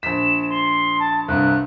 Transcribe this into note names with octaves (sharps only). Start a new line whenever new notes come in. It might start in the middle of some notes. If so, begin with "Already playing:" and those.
A#1 B6 E7
C6
A5
C2 G2 F#6